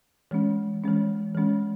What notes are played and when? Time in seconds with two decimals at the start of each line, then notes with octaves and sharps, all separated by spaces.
0.31 E3 G#3 C#4
0.83 E3 G#3 C#4
1.35 E3 G#3 C#4